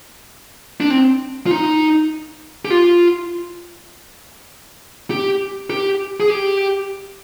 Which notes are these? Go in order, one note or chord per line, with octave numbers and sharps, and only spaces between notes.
D4
C4
F4
D#4
G4
F4
G4
G4
G#4
G4